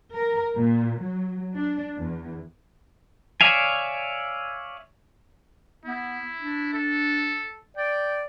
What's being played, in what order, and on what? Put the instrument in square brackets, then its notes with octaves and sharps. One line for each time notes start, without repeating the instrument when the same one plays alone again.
[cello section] A#4
A#2
F#3
D4
E2
[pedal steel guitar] C#5 D5 E5 F5 G#5
[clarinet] B3 [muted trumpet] E4
[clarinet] D4
[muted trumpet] A4
[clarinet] D5 [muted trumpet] G5